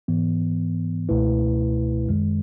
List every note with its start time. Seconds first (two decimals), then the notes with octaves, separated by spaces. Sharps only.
0.08 G#2 E3 B3
1.09 C#2 B2 A3 E4 B4
2.08 F#2 D#3 G#3